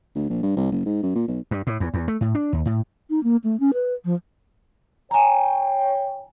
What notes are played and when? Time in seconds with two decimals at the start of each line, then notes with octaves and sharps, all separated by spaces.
0.15 D2
0.29 A#1
0.43 G2
0.56 C2
0.71 F#1
0.86 G#2
1.03 F#2
1.15 A#2
1.28 B1
1.51 G2
1.67 A2
1.80 E2
1.94 E2
2.08 A3
2.21 A2
2.35 D4
2.53 D#2
2.66 A2
3.10 D#4
3.24 A#3
3.44 A3
3.60 C#4
3.74 B4
4.05 F3
5.11 C#5 G5 G#5 A#5